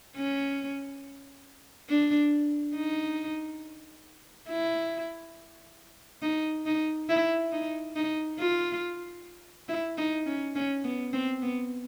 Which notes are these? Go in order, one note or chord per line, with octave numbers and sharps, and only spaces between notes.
C#4
D4
D#4
E4
D#4
D#4
E4
D#4
D#4
F4
E4
D#4
C#4
C#4
B3
C4
B3